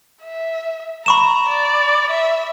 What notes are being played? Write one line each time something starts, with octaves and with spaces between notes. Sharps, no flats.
E5
A#5 B5 C#6 E7
D5
E5